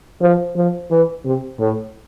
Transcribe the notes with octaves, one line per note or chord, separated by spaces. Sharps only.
F3
F3
E3
C3
A2